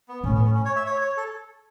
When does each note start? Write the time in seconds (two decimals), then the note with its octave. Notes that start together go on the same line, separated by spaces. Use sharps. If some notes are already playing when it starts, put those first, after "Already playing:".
0.08 B3
0.24 A2 C#4
0.34 B3
0.44 C#4
0.55 C#4
0.65 C#5
0.76 E5
0.87 C#5
1.01 C#5
1.17 A4